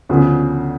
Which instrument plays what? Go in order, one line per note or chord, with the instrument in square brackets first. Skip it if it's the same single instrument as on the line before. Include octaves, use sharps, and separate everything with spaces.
[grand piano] D2 C#3 F3 B3